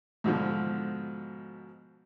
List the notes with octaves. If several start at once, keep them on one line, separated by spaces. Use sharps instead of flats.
G#2 B2 D3 F3